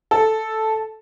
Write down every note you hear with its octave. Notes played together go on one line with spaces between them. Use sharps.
A4